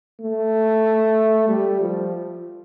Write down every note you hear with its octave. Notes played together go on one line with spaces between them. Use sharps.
A3
G3
F3